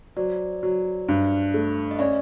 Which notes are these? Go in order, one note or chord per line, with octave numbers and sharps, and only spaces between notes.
F#3 C5 D5
F#3
G2
A3
D#5
C#4 D5 E5